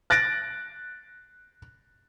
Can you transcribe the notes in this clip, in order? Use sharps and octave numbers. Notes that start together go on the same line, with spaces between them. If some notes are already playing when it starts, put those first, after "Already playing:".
F#6 A6 A#6 D7